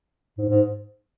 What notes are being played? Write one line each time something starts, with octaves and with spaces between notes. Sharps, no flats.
G#2
G#2